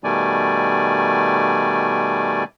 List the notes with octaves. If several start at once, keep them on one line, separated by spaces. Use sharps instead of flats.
B2 D#3 G3 A3 D5 G#5